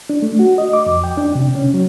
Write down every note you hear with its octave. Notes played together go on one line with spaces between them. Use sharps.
D4
A3
F#4
D#5
D6
F2
G5
D4
C3
C#4
F#3